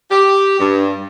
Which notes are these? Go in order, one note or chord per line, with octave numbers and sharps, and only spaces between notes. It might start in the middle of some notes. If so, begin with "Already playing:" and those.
G4
G2